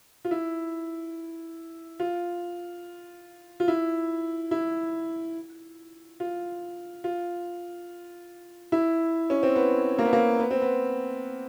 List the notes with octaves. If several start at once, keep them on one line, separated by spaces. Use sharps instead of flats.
F4
E4
F4
F4
E4
E4
F4
F4
E4
C#4
C4
B3
A#3
B3
A#3
B3
C4
B3